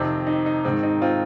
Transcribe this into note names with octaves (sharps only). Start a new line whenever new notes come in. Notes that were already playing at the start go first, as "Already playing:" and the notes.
Already playing: F2 C3 D#3 C4
D#4
D#4
G#2 D#3 C4
D#4
C4 F4